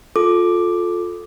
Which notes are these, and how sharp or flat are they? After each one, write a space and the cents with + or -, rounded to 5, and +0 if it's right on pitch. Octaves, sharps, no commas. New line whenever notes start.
F4 +20 A4 -10 D6 +5